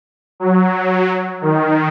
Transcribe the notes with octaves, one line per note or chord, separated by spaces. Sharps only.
F#3
D#3